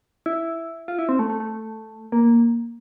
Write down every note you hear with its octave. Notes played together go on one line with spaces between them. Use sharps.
E4
F4
E4
C4
A3
A3
A3
A#3